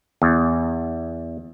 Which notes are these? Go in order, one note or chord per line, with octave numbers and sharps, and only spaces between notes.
E2